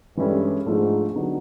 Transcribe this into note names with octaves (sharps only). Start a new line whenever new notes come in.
G2 E3 G#3 C#4 E4 A4
G#2 F3 A3 D4 F4 A4
D3 F#3 B3 D#4 G4